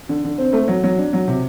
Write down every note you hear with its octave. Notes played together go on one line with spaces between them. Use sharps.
D3
D3
C4
A3
F#3
F#3
D4
F#3
C3